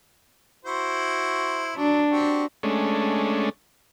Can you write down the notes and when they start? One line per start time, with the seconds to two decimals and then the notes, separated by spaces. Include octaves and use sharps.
0.65 E4 F#4 C5
1.76 F#3 D4
2.09 C4 F#4 G4
2.63 G#3 A3 C#4 D4